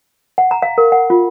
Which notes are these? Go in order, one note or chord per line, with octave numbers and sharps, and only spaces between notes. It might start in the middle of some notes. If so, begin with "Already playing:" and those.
F#5
A#5
F5
A#4
F#5
F4